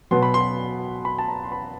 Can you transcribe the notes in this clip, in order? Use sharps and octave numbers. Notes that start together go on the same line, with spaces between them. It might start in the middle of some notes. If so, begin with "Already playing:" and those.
B2 F#3 B3 C6
B5
C6
B5
A5
A#5
C6
B5